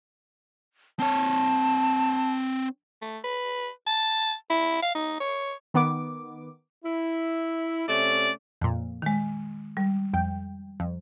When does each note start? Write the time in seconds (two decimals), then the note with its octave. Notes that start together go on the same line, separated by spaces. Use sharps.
0.99 C4 C#5 A5
3.02 A3
3.24 B4
3.87 A5
4.50 E4
4.82 F5
4.95 D#4
5.20 C#5
5.74 D#3 B3 D6
6.84 E4
7.89 C3 A3 C#4 D5
8.61 F2 A#2
9.02 D#3 G#3
9.77 G3
10.14 F2 G5
10.80 F2